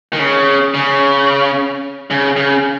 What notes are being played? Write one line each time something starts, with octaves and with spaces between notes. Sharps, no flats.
D#3
C#3
C#3
C#3
C#3